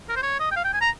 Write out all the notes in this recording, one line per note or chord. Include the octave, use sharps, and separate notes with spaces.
A#4
C5
C#5
D#5
G5
F5
G5
G#5
A#5